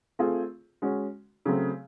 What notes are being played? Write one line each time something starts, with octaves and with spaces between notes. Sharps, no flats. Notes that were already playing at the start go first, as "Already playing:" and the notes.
A3 C4 F4 G#4
G#3 C#4 F#4
C#3 F#3 A3 C4